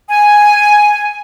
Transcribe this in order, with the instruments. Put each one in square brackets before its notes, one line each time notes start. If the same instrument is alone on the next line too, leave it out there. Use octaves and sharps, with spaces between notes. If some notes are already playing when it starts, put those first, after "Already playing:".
[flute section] G#5